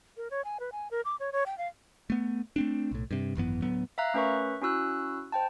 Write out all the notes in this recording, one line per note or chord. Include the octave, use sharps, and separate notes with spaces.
A#4
C#5
G#5
B4
G#5
A#4
D6
C#5
C#5
G5
F5
A3 B3
A3 C4 D4
B1 A2
G2 C3
G#1 F#2 E3 B3
D2 A2 F#3 B3
E5 F5 A#5 F#6
A3 C#4 A#4 B4 E5 C#6
C#4 E4 F#4 E6 F#6
C5 G5 A5